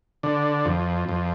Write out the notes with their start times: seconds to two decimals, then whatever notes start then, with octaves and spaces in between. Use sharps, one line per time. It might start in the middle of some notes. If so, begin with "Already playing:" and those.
0.23 D3
0.65 F2
1.09 F2